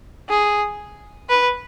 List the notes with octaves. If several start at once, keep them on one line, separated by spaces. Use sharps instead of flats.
G#4
B4